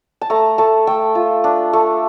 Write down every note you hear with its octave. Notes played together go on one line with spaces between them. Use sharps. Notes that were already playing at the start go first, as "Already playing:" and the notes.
A5
A3 A#5
A3 A5
A3 G5
F4
D4
A3